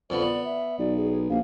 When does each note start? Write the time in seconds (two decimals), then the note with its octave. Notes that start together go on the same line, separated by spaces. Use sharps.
0.10 F2 D3 B3 D5
0.22 B3 D5
0.44 E5
0.79 B1 D5
0.97 G#4
1.30 A#1 F5